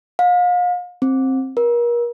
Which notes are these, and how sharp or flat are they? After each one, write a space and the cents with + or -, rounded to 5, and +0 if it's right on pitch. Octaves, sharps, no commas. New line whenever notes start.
F5 +35
C4 +15
A#4 +35